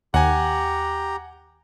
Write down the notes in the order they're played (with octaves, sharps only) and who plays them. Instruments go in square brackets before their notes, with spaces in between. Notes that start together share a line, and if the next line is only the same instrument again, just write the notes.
[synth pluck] D#2 [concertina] G4 A#5 [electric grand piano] F#5 G#5